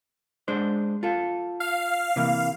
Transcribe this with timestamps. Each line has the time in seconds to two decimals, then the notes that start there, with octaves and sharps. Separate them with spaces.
0.48 G#3 D4 C5
1.03 F4 A4
1.60 F5
2.16 C3 E3 A#3